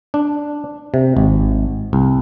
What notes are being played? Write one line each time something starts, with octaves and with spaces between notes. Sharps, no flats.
D4
C3
G#1
C2